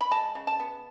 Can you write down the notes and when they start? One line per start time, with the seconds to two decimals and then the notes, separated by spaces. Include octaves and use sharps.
0.01 B5
0.11 G#3 A5
0.35 C#3
0.47 A5
0.60 B3